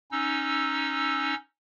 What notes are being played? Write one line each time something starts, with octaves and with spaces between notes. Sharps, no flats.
C#4 D#4 E6